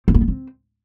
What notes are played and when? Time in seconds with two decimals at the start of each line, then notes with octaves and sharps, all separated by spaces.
0.08 C4
0.14 A#3
0.21 B3
0.28 C4